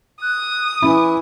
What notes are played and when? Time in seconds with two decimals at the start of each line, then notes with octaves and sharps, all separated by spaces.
0.22 D#6 F#6
0.82 E3 C#4 E4